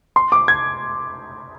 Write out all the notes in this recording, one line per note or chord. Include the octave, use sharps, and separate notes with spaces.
C6
D6
G#6